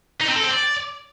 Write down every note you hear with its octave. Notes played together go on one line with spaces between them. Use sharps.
D#4
C4
A4
C4
D5